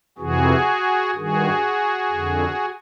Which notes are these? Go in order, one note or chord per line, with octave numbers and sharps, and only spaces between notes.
F2 C3 E3 F#4 G#4
G2 D#3 F#4 G#4
F2 D3